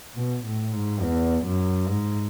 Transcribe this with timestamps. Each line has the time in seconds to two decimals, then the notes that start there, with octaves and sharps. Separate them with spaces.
0.15 B2
0.45 A2
0.73 G#2
1.02 E2
1.46 F#2
1.88 G#2